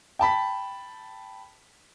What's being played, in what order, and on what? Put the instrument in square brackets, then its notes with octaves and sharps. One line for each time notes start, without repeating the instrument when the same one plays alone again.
[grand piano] G5 A5 B5 B6